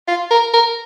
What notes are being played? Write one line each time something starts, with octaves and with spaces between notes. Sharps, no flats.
F4
A#4
A#4